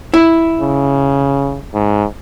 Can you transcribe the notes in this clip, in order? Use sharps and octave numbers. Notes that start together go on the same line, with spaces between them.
E4
C#3
G#2